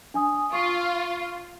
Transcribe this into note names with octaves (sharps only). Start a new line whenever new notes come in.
D4 G#5 D#6
F4 C#6 C7